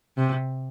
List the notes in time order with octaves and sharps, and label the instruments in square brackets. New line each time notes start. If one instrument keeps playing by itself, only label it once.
[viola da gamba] C3